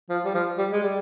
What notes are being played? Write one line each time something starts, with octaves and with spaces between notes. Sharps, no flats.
F3
G3
F3
G3
G#3
G3